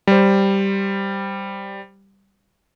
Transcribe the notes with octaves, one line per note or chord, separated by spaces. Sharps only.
G3 C5